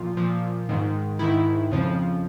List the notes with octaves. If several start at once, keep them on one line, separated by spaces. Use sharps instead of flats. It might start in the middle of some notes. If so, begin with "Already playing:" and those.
Already playing: A#2 F3 F4
A#2 F3
G#2 D#3
G#2 D#3 E4
F2 C#3 F3